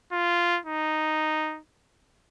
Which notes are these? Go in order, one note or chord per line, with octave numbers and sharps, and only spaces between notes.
F4
D#4